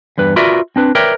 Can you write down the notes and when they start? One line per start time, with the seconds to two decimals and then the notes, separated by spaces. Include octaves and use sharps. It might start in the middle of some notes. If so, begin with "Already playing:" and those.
0.18 E2 G2 B4
0.36 F4 F#4 A#4 B4 D5 E5
0.76 C4 D4 B4
0.95 A#4 B4 C#5 D5 E5 G5